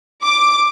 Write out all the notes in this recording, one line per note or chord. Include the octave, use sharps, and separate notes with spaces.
D6